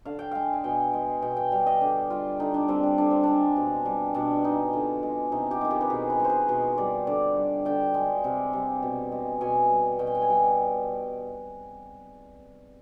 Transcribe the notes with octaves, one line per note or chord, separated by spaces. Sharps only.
D3 F5
G5
G#3 F5
G#5
B2 G5
G#3
B2 G5
G5
G3 F5
D#5
D3 D5
G3 F4
D3 D#4
D4
G3 C4
D4
D3 D4
C4
G#3 D4
B2
G3
B2 D4
G#3 D#4
D3 F4
G#3
C3 D#4
G4
D#3 G#3
G4
B4
B2 G#4
B4
G#3
B4 C5
B2 C5
G3 D5
D3 D5
G3
D3 G5
G#3
C3
G3
B2
G#3
B2 G#5
G3
B2 G5
G#5
G5
G#5
G3 G5